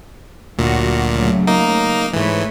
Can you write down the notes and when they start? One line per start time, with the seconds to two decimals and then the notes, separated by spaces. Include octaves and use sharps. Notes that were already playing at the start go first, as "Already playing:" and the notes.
0.58 D2 A#2 F#3 F#4
1.10 C#3 F#3 A3
1.47 A#3 D#4
2.13 G#2 E3 A3 B4 C#5